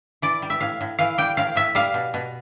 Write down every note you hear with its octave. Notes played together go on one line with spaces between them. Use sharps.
E3 D5
G3
E5
A2 F5
A2
E3 F5
G3 G5
A2 F5
A2 E5
G3 F5
B2
B2